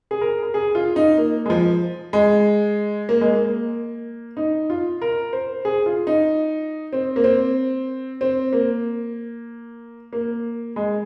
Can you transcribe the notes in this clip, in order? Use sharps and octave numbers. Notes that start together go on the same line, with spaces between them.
G#4
A#4
A#4
G#4
F4
D#4
A#3
G#3
F3
G#3
A#3
G#3
A#3
D#4
F4
A#4
C5
G#4
F4
D#4
C4
A#3
C4
C4
A#3
A#3
G#3